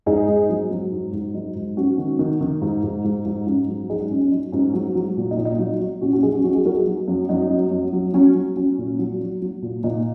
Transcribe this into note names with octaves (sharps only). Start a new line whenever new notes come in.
G#2 D#4 G#4
G#2
F#3
F#3
G#2
G#2
F#3 D#4
G#2
F#3 C#4 F#4
D#3
D#3
D#3
G#2
G#2
G#2
G#2
G#2 C#4
F#3
F#3 D#4 G#4
D#4
G#2 C#4
C#4
F#3 D#4
G#2 C#4
F#3
F#3
A#2
D#4
A#2
D#4
F#3 D#4
F#3
A#2 C#4 F#4
C#4 F#4
F#3 D#4 G#4
C#4 F#4
F#3 C#4 F#4
D#4 G#4
F#3 F#4 A#4
D#4 G#4
F#3
F#2
F#2 D#4
F#3
F#2
F#3
F#3 C#4
F#3
F#3 C#4
A#2
F#3
F#3
F#3
A#2
A#2 D#4